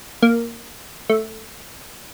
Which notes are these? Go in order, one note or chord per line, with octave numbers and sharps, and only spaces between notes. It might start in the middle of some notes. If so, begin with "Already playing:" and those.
A#3
A3